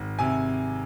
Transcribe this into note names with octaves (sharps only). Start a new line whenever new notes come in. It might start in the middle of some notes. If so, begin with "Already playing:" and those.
Already playing: G#1
C3 G#5